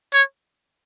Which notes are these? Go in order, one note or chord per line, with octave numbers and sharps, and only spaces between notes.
C#5